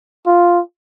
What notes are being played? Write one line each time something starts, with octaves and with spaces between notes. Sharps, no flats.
F4